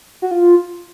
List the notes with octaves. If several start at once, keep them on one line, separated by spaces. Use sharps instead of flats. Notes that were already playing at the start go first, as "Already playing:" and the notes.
F#4
F4